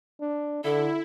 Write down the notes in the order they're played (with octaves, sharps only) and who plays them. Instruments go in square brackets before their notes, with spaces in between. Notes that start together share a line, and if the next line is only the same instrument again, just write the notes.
[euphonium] D4
[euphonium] D3 [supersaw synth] E4 [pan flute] A4